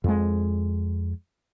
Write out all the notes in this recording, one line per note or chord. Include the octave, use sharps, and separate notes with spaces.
F2 G#3